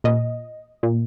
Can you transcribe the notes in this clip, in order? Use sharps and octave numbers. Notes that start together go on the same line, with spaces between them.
A#2 D#5
A#2